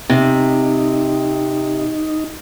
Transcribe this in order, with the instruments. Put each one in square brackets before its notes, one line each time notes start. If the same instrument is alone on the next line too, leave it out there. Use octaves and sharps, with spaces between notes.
[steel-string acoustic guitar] C3 [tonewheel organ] D#4